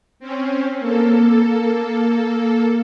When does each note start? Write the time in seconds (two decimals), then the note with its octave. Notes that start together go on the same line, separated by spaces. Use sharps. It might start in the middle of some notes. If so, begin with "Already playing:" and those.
0.20 C4 C#4
0.80 A#3 A4